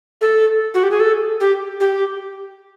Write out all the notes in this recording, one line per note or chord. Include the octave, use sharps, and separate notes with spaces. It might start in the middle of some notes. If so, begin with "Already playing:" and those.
A4
F#4
G4
G#4
A4
G4
G4